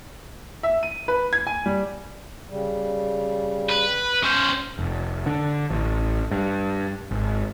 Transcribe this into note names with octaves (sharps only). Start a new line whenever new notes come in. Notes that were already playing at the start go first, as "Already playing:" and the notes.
E5
D#7
B4
G#6
G#5
G3
C#3 G3
B4
C#4 C5
F1
D3
A1
G2
G#1